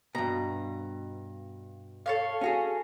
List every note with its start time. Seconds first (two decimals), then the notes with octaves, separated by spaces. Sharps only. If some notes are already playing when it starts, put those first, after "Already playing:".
0.15 G2 B2 A#5
2.06 A4 C#5 F5
2.41 C#4 F#4 G#4